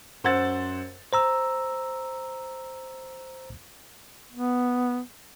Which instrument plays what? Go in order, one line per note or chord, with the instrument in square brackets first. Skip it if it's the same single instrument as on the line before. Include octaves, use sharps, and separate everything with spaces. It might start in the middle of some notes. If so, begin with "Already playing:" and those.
[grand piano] F#2 C5 F#5 E6 A6
[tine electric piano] C5 A#5 E6
[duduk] B3